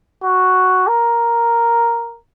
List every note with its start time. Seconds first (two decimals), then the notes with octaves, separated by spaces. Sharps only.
0.24 F#4
0.87 A#4